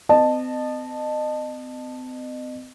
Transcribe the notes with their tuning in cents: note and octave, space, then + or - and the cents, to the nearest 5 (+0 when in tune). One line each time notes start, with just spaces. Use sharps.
C4 -40 D#5 -30 A5 +0